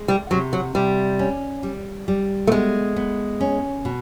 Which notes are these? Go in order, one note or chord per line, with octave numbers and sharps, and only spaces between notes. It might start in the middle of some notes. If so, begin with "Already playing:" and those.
Already playing: G#3
G3
C3 F#3
F#3
C3 G3
C#4
G3
G3
A3
G#3 B3
B3
C#4
B2